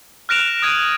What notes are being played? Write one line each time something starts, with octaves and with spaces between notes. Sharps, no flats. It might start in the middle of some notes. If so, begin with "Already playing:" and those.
F6 F#6 A#6 D7 E7 F7
D#6 G#6 A#6 D7 D#7